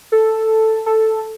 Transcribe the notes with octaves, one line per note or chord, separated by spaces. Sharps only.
A4
A4